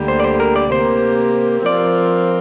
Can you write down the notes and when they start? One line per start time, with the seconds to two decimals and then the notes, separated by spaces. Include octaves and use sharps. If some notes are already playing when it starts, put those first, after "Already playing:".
Already playing: D2 D3 G3 A#3 G4
0.08 C5
0.20 D5
0.24 C5
0.40 A#4
0.56 D5
0.72 C3 A#3 G4 A#4 C5
1.66 F3 C4 F4 A#4 D5